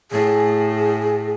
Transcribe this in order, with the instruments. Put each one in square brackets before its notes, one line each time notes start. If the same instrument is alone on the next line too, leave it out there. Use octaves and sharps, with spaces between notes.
[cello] A2 [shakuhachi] G#4